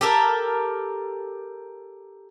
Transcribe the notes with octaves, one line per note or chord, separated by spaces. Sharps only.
G4 A4 A#4